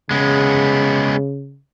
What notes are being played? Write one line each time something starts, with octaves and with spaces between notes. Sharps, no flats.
C#3 G#3 B3